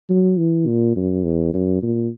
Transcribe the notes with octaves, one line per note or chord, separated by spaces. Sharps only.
F#3
E3
A#2
F#2
E2
F#2
A#2